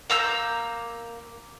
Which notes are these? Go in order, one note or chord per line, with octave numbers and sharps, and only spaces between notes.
A#3 A#5 E6 G6